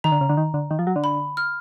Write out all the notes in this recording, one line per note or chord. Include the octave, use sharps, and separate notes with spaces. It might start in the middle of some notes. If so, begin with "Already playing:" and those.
D#3 A#5
D3
C#3
D3
D#3
D3
D#3
F3
F#3
D3
B5
F6